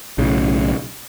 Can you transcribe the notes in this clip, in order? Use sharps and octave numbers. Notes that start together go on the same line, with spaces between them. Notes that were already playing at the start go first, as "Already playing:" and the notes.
B1 A2 C#3